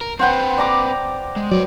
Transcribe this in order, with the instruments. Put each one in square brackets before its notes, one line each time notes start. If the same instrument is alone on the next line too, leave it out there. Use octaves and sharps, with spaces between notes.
[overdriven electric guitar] A#4
[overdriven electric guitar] C4 B4 [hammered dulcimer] C5 F#5 G5
[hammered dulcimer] D5 A#5 D6
[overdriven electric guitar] G#3
[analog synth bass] F#3 [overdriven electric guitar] B4 D5